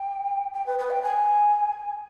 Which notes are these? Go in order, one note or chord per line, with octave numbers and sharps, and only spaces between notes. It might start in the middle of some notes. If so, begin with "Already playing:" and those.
Already playing: G5
G5
B4
B4
G5
G#5